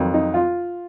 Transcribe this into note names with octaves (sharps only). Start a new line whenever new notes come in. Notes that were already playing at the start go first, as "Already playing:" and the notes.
Already playing: F2 D#3 F#3
D#4
F4